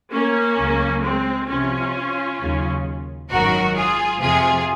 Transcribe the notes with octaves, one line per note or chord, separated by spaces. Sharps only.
A#3 C#4
C#2 C#3 F#3
G#3 C4
C2 C3 F3 C#4 F4
D#2 C#3 F#3
G#1 F#2 D#3 F#3 F#4 A#4
F4 G#4
F2 C3 F3 F4 G#4